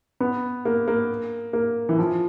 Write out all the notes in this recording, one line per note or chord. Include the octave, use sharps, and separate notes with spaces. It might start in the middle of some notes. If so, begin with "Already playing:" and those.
B3
A#3
A#3
A#3
E3
F3